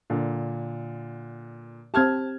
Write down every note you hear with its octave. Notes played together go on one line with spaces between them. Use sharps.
A#2 D3
C4 G4 A5 F6 G#6